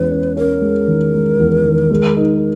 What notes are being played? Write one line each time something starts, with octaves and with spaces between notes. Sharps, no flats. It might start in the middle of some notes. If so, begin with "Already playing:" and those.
Already playing: E2 G#3 C#4 B4
C#4
C#4 A#4
G#3
D#3
G#3
E2
D#3
G#3
D#4